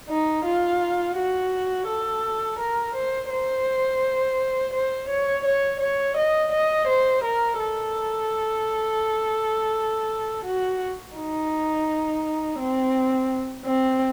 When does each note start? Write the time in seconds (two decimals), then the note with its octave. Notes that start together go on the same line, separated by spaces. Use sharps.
0.09 D#4
0.45 F4
1.17 F#4
1.88 A4
2.58 A#4
2.95 C5
3.30 C5
4.73 C5
5.09 C#5
5.45 C#5
5.80 C#5
6.17 D#5
6.52 D#5
6.87 C5
7.24 A#4
7.59 A4
10.45 F#4
11.16 D#4
12.59 C4
13.65 C4